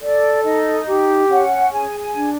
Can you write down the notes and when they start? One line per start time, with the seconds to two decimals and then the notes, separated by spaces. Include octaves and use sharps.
0.01 A4 D5
0.44 D#4 D#5
0.87 G4
1.29 C#4 F#5
1.71 G#4 G#5
2.00 G#5
2.15 D4